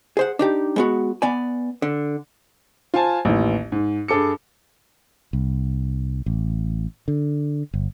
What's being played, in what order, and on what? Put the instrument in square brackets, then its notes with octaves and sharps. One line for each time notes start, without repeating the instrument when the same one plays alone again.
[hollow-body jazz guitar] G#4 C5 F#5
D4 D#4 G4
G#3 B3 F#4
B3 D5 G#5
D3
[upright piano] F4 C5 F5 G#5 A5
A1 D#2 E3
G#2
G2 G#4 A4 D6 C#7
[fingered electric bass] C2
A1
D3
G1